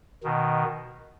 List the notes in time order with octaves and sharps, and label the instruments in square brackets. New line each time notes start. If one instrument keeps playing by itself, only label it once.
[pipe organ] B2 D#3